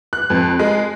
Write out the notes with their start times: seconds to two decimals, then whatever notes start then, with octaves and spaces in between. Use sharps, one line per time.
0.13 F#6
0.30 F2
0.59 G#3